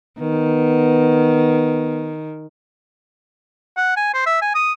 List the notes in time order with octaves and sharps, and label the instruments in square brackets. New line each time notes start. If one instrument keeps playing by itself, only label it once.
[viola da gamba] D#3 [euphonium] B3
[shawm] F#5
G#5
C5
E5
G#5
D#6